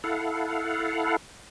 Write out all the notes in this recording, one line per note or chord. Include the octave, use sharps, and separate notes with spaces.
E4 A4 F5 F#5